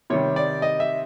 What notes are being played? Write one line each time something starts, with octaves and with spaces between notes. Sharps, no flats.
C3 D#3 G3 C#5
D5
D#5
E5